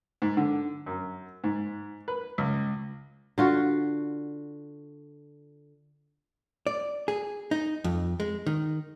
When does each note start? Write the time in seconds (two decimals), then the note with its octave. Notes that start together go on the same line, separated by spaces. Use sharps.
0.22 G#2
0.37 D3
0.86 F#2
1.44 G#2
2.08 B4
2.38 C#2
3.38 D3 F4 F#4
6.67 D5
7.08 G#4
7.51 D#4
7.84 F2
8.20 G#3
8.47 D#3